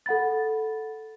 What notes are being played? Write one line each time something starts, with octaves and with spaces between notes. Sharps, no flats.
A4 F#5 B5 A6